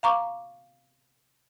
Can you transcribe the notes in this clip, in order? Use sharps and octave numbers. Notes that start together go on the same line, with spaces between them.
F5 A#5 C#6 D6